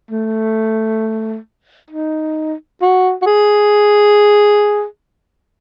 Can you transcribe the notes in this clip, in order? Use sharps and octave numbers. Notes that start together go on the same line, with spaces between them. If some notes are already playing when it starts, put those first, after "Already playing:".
A3
D#4
F#4
F#4
G#4